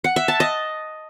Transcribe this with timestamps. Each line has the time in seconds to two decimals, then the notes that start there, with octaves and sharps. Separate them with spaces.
0.04 F#5
0.16 E5
0.28 A5
0.40 D#5